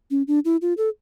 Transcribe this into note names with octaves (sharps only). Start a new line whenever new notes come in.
C#4
D4
E4
F4
A4